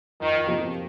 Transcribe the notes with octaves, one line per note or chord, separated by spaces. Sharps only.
F2 D#3
C3 F3 A#3 G4